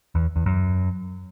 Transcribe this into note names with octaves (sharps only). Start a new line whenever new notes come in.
E2
E2
F#2